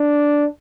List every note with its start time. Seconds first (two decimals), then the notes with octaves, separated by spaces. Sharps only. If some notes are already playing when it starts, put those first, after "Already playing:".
Already playing: D4